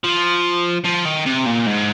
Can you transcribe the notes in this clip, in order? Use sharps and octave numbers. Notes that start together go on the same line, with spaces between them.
F3
F3
D#3
C3
A#2
G#2